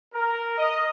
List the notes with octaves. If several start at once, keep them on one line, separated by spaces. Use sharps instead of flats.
A#4
D#5